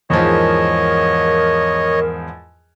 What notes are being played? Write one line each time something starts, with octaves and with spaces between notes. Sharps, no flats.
E2 G#2 F3 A#4 C#5 D#5